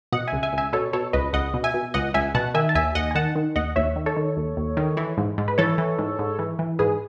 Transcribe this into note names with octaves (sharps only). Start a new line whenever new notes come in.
B2 D#5 F#5
C#2 E5 G#5
E5 G#5
C#2 E5 G#5
B2 A4 C#5
B2 A4 C#5
C#2 B4 D#5
C#2 D#5 F#5
B2
E5 G#5
B2
C#2 D#5 F#5
C#2 E5 G#5
B2 F#5 A5
D#3 E5 G#5
A5
D#2 E5 G#5
D#2 D#5 F#5
G#5
D#3 F#5 A5
D#3
D#2 D#5 F#5
D#2 C#5 E5
D#3
A4 C#5
D#3
D#2
D#2
D#3
E3
G#2
G#2
B4
E3 A4 C#5
E3
G#2
G#2
E3
E3
G#2 G#4 B4